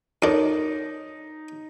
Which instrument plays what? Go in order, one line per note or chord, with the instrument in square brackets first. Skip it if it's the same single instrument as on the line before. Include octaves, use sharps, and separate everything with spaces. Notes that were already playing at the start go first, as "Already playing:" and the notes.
[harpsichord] F2 D4 [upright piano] D#4 [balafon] A#4 C#5